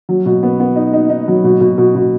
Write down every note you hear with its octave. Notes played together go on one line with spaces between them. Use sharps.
F#3
B2
B3
B3
D#4
D#4
D#4
F#3
B2
B2
B2
B2